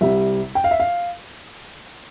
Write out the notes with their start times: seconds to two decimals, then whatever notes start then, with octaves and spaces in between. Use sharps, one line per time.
0.01 C2 C3 G3 E5
0.55 G5
0.64 F5
0.71 E5
0.80 F5